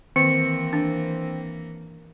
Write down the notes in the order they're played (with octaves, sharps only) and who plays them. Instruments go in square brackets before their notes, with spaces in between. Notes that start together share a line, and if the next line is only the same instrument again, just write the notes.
[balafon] D#3 [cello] E3 A#3 [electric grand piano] C4 [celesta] C#7
[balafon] D4